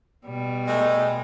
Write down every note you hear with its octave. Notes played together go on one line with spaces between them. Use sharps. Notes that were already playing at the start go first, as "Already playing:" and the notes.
B2 G3
G#3 A3